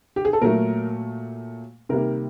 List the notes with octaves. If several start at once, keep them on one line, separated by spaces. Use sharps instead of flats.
G4
G#4
A4
A#2 F#3 A3 A#4
C3 D#3 G3 A#3 A#4